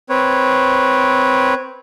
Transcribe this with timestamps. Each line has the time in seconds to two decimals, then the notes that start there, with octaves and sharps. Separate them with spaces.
0.09 C4 B4 C#5